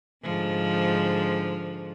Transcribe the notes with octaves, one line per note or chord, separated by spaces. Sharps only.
G#2 D3 F3